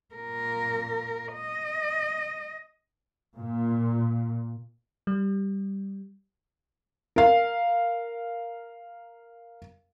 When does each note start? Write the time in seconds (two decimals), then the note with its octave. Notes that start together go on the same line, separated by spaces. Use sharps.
0.15 A#2 A#4
1.33 D#5
3.36 A#2
5.07 G3
7.16 A#4 F5